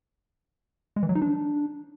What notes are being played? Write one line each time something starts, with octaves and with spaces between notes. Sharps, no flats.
G#3
E3
F#3
D#4
D4